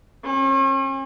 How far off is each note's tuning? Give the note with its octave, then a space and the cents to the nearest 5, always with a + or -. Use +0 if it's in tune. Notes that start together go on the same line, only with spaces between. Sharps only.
C#4 -40